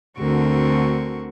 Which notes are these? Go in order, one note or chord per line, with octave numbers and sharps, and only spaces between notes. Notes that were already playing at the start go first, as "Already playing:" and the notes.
D2 D3 C4 F#4 A#4 C#6